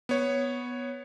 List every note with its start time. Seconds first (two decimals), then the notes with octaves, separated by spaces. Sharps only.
0.09 B3 C#5